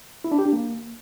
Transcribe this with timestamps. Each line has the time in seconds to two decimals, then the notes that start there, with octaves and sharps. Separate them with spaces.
0.24 E4
0.32 D4
0.39 G4
0.46 D4
0.53 A#3